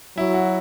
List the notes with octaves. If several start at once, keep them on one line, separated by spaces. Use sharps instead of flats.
F#3 E4
F#4